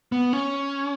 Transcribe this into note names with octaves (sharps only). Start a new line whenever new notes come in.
B3
C#4